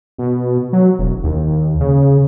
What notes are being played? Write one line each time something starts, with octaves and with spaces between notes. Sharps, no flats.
B2
F#3
E1
D#2
C#3